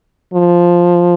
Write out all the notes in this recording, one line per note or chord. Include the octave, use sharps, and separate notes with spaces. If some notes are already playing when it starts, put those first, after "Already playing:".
F3